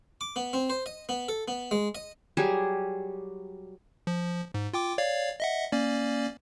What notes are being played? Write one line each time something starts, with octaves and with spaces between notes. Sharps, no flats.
D6
B3
C4
C5
D#5
B3
A4
B3
G#3
D#5
F#3 G3 G4 G#4
F3
G#2
F4 G5 D6
C#5 D5 F5
D#5 E5 F#5
A#3 C#4 D5